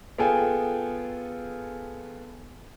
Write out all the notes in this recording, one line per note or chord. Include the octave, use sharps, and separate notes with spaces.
B3 F4 G#4 A4 G5 G#5